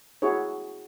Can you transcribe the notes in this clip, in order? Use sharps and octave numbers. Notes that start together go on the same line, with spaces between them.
E4 F#4 G#4 C#5